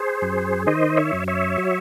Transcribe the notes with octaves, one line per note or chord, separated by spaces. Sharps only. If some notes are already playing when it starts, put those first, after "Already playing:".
Already playing: G#4 C5
F#2
D#3 C5 D#5
C#5 E5
F#2
C#5 E5
F#3